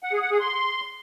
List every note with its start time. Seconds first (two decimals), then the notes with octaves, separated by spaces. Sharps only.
0.03 F#5
0.13 G#4
0.22 F#5
0.31 G#4
0.40 C6